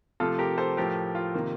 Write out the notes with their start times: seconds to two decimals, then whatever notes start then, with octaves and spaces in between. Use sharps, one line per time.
0.20 C3 F3 A3 F4 A4
0.39 G4 A#4
0.58 A4 C5
0.77 A2 F3 A3 G4 A#4
1.15 F4
1.34 C3 D#3 A#3